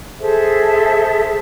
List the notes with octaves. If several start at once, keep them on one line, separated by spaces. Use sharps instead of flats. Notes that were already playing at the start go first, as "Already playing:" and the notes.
G#4 A4 C5 E5